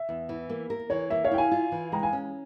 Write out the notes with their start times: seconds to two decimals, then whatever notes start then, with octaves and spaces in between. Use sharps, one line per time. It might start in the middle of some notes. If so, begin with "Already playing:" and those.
Already playing: E5
0.09 E2
0.29 E3
0.49 A#3
0.70 A#4
0.90 E3 C#5
1.10 A#3 E5
1.24 C#5 F5
1.31 E4 G5
1.38 F5 G#5
1.51 F4
1.72 E3
1.92 G#3 G5 A#5
2.03 F5 G#5
2.13 C#4